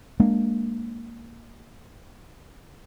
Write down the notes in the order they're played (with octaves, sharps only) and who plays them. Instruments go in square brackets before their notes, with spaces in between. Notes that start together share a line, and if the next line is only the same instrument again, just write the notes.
[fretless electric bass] G#3 A#3 D4